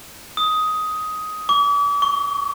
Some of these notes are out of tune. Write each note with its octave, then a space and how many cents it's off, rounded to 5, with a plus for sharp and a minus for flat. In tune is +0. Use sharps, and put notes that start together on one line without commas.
D#6 +10
D6 -40
C#6 +20